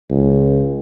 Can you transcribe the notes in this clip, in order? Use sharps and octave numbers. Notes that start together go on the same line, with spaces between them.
C#2